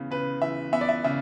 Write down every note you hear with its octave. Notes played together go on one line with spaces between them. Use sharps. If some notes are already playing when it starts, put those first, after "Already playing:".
Already playing: C#3 E3 B3
C#3 B4
E3 E5
B3 E5
D5
E5
C#3 E5